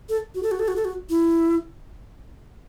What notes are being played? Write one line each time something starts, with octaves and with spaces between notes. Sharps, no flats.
A4
F#4
A4
F#4
A4
F#4
A4
F#4
E4